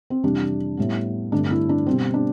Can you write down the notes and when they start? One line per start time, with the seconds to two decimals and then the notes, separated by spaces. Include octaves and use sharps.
0.10 C4
0.23 F2 C3 E3 G3 D4
0.77 A2 G3 B3
1.32 G2 D3 A3 C4 D4
1.51 E4
1.69 D4
1.87 B2 G3 C4
2.14 D4